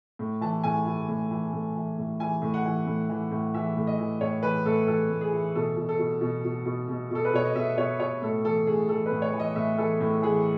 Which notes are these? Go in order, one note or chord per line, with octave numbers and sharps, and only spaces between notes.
A2
E3 A5
A2 G#5
E3
A2
E3
A2
E3
A2
E3 G#5
A2
F#5
E3
A2
E3
A2
E3 E5
A2
D#5
E3
A2 C#5
E3 B4
A2 A4
E3 A4
A2
G#4
E3
B2 A4
B2
A4
B2
B2
B2
B2
B2
B2 A4
B4
B2 C#5
D#5
B2 E5
B2 C#5
B2 C#5
A2 A4
E3 A4
A2 G#4
E3 A4
B4
A2
C#5
E3
D#5
A2 E5
E3 A4
A2
E3 G#4